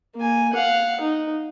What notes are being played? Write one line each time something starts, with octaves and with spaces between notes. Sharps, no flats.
A#3 G#5
F5 F#5
D#4